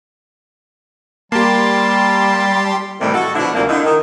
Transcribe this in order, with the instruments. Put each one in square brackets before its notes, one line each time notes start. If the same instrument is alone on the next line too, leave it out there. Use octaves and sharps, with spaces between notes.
[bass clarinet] G3 [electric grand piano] A#3 [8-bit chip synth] G4 C6 [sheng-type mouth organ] A5
[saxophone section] A2 C3 D#3 E3 G3 A3
F#4 A4
B2 D3 F3 D4 E4
D2 C3 F3 G3 A#3
D3 D#3 E4
D#3